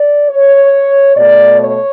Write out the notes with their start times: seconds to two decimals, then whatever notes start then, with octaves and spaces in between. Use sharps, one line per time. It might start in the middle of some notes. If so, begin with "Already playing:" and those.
Already playing: D5
0.29 C#5
1.16 B2 A3 D5
1.60 C#5